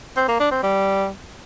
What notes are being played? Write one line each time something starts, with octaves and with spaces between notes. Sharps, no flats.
C4
A#3
D4
C4
G3